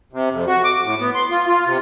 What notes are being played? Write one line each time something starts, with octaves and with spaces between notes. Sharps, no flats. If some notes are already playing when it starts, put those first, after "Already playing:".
C3
F2
F#4
D6
A2
B3
C6
F4
F4
C3